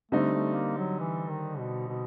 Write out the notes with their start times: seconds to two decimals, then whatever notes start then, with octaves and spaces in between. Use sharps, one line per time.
0.11 D3 G3 A3 C4 D#4
0.34 A3
0.56 A#3
0.77 F#3
1.00 E3
1.29 D#3
1.58 B2
1.88 B2